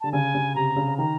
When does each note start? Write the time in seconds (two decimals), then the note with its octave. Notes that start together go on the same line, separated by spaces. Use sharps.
0.01 D3 A5
0.12 C#3 G#5
0.35 C#3
0.55 C3 A#5
0.76 C#3
0.98 D#3 A#5